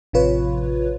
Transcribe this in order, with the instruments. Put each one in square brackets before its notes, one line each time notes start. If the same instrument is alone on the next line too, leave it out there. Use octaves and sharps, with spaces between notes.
[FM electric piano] A1 C3 F3 F4 B4 C#5